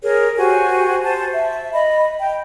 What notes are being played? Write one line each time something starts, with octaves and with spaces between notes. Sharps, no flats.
G#4 A#4 C#5
F#4 G4 C5 G#5
C5 A5
E5
D#5 B5
G5